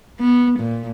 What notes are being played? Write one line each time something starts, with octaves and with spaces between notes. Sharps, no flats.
B3
A#2